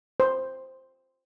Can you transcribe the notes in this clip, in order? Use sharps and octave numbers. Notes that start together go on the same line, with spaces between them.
C5